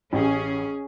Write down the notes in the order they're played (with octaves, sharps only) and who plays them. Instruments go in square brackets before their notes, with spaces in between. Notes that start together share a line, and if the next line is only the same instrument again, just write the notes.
[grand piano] A1 G4 [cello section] C#4 G#4